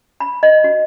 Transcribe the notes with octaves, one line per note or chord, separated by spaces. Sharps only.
B5
D#5
F#4